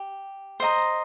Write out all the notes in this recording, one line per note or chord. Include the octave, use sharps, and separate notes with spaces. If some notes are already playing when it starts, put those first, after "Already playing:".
Already playing: G4
C5 D#5 A#5